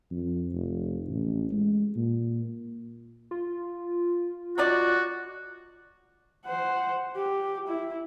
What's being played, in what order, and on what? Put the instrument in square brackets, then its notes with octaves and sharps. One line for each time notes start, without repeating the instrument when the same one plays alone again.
[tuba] F2
F1
A1
G#3
A#2
[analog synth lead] F4
[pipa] F#3 D#4 D5 [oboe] F#4
[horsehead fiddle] C5 F#5
G4
E4